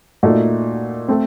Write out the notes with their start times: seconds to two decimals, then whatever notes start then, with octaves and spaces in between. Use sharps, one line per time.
0.23 A#2 A3 D#4 F#4
1.08 A3 C4